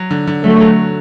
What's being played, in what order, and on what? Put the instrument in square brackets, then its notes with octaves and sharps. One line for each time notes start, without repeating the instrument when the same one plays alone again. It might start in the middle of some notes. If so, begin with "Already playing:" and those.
Already playing: [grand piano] F#3
D3
D3
[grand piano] D3 [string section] F#3 A3
[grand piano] F#3